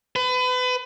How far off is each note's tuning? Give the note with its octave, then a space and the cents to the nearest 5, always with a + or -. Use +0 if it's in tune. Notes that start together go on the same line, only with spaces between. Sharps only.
B4 +30